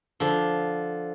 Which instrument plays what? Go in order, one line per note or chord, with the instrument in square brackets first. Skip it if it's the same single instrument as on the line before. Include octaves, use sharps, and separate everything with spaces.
[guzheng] D3 F3